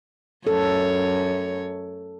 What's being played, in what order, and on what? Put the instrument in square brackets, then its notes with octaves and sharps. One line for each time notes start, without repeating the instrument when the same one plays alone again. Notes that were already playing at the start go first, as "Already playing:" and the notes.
[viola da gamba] F#2 C#5 [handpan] A4